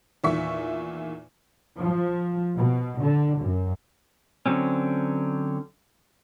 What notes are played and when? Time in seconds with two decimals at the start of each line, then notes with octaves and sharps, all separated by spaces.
0.24 E2 A#2 D#3 E5 C#6 B6
1.80 F3
2.55 B2
3.00 D3
3.40 F#2
4.46 D3 F#3 C4 C#4